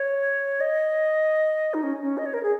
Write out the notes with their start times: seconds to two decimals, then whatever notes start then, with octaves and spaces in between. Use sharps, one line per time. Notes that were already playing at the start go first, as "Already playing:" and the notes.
Already playing: C#5
0.60 D#5
1.74 D#4
1.83 C#4
2.02 C#4
2.18 D#5
2.26 C#5
2.34 A#4
2.43 G#4